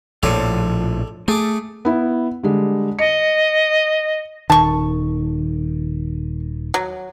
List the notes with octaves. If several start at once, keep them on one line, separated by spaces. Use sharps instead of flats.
A#1 A2 F3 A4 C#5 D5
A3 G#4 D6
B3 E4
D3 G3 G#3
D#5 C#7
D#1 D#3 A5 C#6
F#3